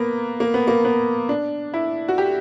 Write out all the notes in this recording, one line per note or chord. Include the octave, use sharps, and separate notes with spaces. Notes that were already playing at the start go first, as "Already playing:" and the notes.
Already playing: A#3 B3
A#3
B3
A#3
B3
D4
E4
F#4
G4